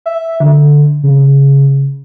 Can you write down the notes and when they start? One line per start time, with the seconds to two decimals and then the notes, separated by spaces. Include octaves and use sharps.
0.06 E5
0.40 D3
1.03 C#3